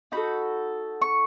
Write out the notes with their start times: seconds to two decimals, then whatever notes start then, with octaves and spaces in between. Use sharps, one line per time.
0.12 D#4 F#4 A4 B5
1.02 C#6